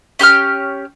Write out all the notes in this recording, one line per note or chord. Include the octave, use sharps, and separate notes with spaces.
C#4 G4 C6 F6